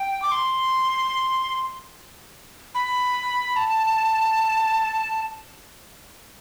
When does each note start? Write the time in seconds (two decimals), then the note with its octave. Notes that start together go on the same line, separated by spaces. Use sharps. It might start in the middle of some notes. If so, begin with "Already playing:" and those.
Already playing: G5
0.22 D6
0.32 C6
2.75 B5
3.56 A5